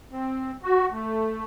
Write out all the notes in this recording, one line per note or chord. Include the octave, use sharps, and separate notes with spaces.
C4
F#4
A3